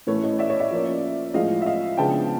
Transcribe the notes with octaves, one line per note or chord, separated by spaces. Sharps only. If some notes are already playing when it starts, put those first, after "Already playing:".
A2 E3 A3 C#4 B4 C#5
C#5 D#5
D5 E5
C#5 D#5
D5 E5
F3 A#3 C#4
A2 F3 G#3 D#5 F5
E5
D#5 F5
C#3 F3 G#3 B3 D4 G5 A5